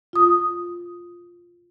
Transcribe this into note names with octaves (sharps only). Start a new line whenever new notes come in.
F4 D#6